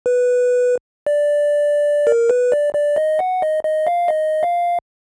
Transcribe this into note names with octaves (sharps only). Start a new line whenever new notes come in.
B4
D5
A#4
B4
D5
D5
D#5
F#5
D#5
D#5
F5
D#5
F5